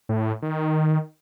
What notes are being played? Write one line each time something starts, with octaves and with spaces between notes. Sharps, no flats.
A2
D#3